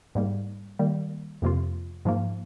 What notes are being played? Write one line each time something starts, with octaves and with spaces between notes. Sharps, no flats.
G#2 G3 A#3
D#3 G3 A#3
F2 C3 F3 A#3 F4
G#2 F3 A#3